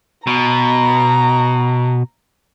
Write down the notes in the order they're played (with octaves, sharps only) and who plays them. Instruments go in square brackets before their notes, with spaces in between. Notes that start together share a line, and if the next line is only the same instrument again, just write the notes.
[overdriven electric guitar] B2 [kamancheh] A#5